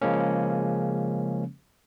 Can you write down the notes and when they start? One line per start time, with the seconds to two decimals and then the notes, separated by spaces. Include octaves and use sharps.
0.01 C#3 F3 G#3 A#3 C#4